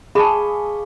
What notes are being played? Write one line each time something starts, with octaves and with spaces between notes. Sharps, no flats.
G#4 F5 A5 B5 C#6 D6